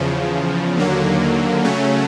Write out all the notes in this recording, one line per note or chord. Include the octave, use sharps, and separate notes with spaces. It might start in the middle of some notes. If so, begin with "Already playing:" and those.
Already playing: E2 C#3 F3
D#2 D3 F#3 A#3
C#3 F#3 A3 C#4